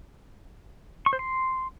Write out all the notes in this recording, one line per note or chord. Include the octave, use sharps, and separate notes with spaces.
C#6
C5
C6